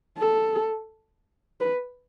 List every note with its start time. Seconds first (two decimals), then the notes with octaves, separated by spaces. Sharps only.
0.18 A4
1.60 B4